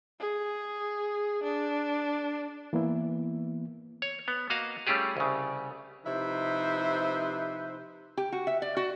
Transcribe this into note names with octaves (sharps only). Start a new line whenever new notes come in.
G#4
D4
E3 A#3 B3 E4
C#5
B3
A#3 F#4 D#5 F5
G3 A3 C#4 F4 G4 G#4
C2 C#3
C3 F3 D#4 E4 B4 C5
G4
F#4
E5
D5
F#4